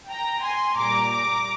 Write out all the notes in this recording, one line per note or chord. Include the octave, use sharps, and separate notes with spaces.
G5 A#5
G#5 C6
A#2 G3 A#5 D6
A#5 D6